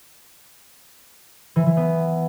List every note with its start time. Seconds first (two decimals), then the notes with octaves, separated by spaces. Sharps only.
1.56 E3
1.66 E3
1.77 B3